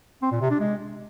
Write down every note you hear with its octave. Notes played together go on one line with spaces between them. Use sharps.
C4
A#2
C3
D4
G#3